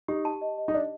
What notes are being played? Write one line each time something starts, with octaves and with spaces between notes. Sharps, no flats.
D#4 G4
A5
D#5
D#5
D#4
D4 D#5